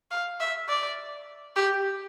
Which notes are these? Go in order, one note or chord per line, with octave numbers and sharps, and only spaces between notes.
F5
E5
D5
G4